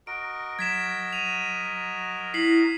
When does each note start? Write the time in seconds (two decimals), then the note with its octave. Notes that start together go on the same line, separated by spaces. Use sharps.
0.07 F#4 A#4 D#5 D7
0.59 F#3 G#6 B6 E7
1.13 D#7 F7
2.34 E4 B6 C7 F#7